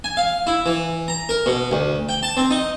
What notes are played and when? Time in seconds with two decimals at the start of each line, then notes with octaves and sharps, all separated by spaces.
0.04 G#5
0.17 F5
0.47 E4
0.66 E3
1.08 A#5
1.29 A#4
1.46 B2
1.71 D2
2.09 G5
2.23 A5
2.37 C4
2.51 D#4